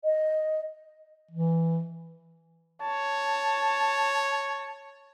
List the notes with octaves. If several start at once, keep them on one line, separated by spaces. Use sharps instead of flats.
D#5
E3
C#5 A5